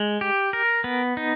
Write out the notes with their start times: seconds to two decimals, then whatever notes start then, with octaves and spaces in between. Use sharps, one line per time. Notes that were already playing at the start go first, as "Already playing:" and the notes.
Already playing: G#3
0.21 G4
0.53 A#4
0.84 B3
1.17 D#4